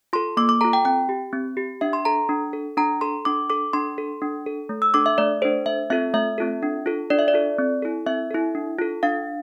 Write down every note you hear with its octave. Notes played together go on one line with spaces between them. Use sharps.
F4 A4 C6
A#3 D6
D6
F4 A4 A#5
G5
C4 G5
G4
C4
G4
D4 E5
C6
A4 A#5
D4
A4
D4 A#5
A4 C6
D4 D6
A4 D6
D4 C6
A4
D4
A4
A3
E6
D4 A4 D6
E5
A3 D5
D4 A4 C5
A3 E5
C4 F4 A4 E5
A3 E5
C4 F4 A4
D4
F4 A4
D4 D5
E5
D5
F4 A4
C4
E4 A4
C4 E5
E4 A4
D4
F4 A4
D4 F5